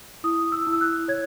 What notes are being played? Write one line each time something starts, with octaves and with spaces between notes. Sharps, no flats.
E4 D#6
E6
E4
E6
F#6
C#5 G#6